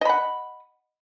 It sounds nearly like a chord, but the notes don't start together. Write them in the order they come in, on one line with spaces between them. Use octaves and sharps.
D#5 B5 F#5